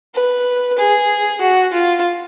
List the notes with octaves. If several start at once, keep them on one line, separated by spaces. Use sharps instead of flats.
B4
G#4
F#4
F4